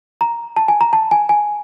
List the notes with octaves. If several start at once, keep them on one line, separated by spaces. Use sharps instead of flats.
A#5
A5
G#5
A#5
A5
G#5
G#5